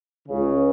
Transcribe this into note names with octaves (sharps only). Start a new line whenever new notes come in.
C#2 C#3